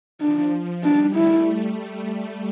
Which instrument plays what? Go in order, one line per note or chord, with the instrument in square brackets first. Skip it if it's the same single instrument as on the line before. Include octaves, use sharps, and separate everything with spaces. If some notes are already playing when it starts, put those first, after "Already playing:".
[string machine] F3 [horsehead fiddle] D4
[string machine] G3 [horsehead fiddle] D4
[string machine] A3 [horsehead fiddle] E4